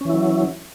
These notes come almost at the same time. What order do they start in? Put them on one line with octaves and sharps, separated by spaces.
C#4 E3 E4 F#3